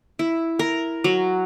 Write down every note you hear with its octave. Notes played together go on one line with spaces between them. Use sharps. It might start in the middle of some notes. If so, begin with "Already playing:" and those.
E4
A#4
F#3